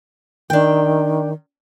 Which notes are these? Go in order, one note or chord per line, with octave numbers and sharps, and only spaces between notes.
D#3 D4 G5